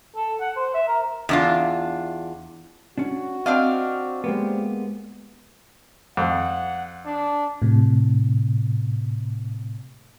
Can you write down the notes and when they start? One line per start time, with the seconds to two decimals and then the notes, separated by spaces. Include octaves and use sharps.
0.16 A4
0.41 F#5
0.56 C5
0.74 E5
0.88 A#4
1.29 E2 D4 F4
2.98 C#4 D4 F#4
3.46 C4 D4 D#5 F5
4.24 G#3 A#3 B3 G4
6.17 F2 F#5
7.05 D4
7.62 A2 C3